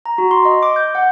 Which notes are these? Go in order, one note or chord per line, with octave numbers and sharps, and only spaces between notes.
A#5
F#4
C6
D#5
D6
G6
F#5